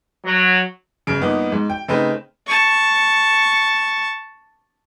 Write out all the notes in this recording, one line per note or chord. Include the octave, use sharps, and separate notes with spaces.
F#3
G1 C#3 D7
G2 A#2 B3 D#4
G#2
G5
C#3 A3 C4 D#4 B4
A5 C#6